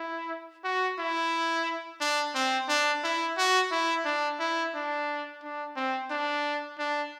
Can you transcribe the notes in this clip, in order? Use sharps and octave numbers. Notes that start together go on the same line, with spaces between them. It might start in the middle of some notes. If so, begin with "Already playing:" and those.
Already playing: E4
F#4
E4
D4
C4
D4
E4
F#4
E4
D4
E4
D4
D4
C4
D4
D4